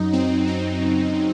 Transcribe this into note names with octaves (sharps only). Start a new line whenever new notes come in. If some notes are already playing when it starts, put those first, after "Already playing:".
Already playing: F#2 F#3 D#4
F#3 C4
F#3 C4
C#3
F#3